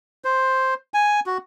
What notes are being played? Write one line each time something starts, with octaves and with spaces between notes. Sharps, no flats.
C5
G#5
F#4